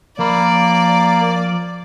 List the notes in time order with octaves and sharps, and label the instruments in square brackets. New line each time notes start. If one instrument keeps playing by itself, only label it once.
[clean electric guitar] F3 B5 [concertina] A#3 [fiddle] D5